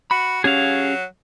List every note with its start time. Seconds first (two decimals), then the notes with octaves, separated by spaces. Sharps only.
0.11 F#4 B5
0.44 F#3 C#4 G4 G#4 F5